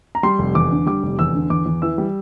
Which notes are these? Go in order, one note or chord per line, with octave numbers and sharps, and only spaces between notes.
A#5
G3 C6
F1
E2 D6
D3
G3 D6
F1
E2 E6
D3
E2 D6
E2
E3 E6
G3